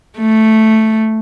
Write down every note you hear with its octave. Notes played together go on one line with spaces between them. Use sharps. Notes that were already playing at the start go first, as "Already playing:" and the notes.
A3